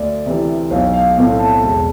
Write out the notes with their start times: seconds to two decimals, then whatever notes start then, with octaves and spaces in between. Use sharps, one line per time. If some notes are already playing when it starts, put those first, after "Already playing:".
Already playing: D2 D5
0.26 C3 E3
0.71 B1 F5
0.93 F5
1.17 A2 F3 A3 C4 F5
1.39 A5
1.62 E1 A5